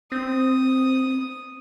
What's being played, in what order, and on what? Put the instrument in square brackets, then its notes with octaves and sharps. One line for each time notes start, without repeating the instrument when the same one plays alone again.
[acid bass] C4 [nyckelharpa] D#6